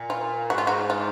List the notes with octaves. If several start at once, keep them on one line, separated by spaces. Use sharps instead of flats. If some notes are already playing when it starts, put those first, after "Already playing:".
Already playing: A#2
F4
G#2 F#4
F4
F#4
F4